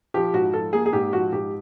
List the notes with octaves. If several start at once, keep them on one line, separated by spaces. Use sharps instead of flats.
F3 G4
G#2 F#4
F3 A4
A#3 G#4
G#4
G#2 G4
F3 F#4
G#2 G4